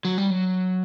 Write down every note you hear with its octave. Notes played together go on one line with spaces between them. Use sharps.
F#3
G3
F#3